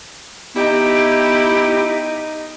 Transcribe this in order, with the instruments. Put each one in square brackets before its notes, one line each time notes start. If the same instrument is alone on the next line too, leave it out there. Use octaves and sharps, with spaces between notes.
[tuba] B3 [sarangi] D#4 [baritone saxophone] E4 [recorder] G4